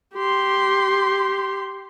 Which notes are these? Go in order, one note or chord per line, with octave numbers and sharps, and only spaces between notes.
G4 C6